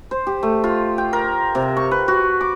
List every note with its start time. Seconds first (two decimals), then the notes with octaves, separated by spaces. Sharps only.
0.11 C5
0.27 G4
0.43 A3
0.64 F4
0.98 G5
1.13 A#4
1.55 C3
1.77 C#6
1.91 B4
2.08 F#4
2.41 D6